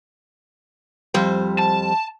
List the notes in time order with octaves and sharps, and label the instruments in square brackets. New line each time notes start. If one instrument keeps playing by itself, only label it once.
[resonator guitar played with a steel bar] F2 G3 C5
[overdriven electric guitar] A5